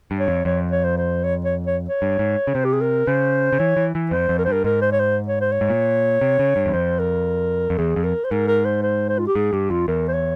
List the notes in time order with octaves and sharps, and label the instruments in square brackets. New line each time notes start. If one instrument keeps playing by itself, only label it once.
[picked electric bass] G2
[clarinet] C#5
[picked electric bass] F2
[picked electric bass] F2 [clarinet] C#5
[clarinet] C#5
C5
C5
C#5
C#5
C#5
C#5
[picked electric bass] G2
G#2
C#3
[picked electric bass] C3 [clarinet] C5
[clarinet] G4
G#4
A#4
[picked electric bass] C#3 [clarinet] C5
[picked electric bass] C#3
[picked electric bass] E3 [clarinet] C#5
[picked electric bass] E3
E3
[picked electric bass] F2 [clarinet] C5
[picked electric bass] F2
[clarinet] A#4
[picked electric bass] G2 [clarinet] C5
[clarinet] A#4
[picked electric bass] G#2 [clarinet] A#4
[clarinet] C5
C#5
C5
C#5
C5
C#5
[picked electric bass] G#2
A#2
C3
C#3
G2
E2
[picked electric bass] F2 [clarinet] C5
[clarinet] A#4
[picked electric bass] F2
[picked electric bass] E2 [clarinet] G#4
[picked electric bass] F2
[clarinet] A#4
C5
[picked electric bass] G#2 [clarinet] A#4
[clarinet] A#4
C5
C5
C5
F4
G4
[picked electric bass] G#2 [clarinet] G#4
[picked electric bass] G2 [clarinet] G4
[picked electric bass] F2 [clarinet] F4
[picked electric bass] E2 [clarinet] A#4
[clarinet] C5
C#5